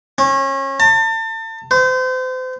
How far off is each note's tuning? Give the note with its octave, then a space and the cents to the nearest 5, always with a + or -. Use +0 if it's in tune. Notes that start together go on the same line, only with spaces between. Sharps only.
C#4 -30
A5 +35
C5 -35